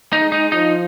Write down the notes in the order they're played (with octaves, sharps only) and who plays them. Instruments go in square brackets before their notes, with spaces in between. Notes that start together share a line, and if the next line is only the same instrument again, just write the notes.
[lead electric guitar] D#4
[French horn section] G#3
[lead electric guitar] D#4
[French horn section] F3 [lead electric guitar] D#4